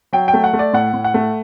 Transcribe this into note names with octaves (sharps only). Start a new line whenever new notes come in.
F#3 G5
G5
A3
F#5
A3
D5
A2 F#5
A2
F#5
A3